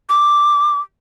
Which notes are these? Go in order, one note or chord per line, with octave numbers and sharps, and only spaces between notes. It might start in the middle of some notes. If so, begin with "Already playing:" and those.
D6